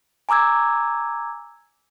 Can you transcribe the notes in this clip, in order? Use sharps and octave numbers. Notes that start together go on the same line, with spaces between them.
G#5 A#5 D6 E6 G#6